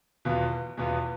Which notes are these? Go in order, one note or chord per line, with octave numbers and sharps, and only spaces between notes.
E2 B2 B3 F4
E2 B2 B3 F4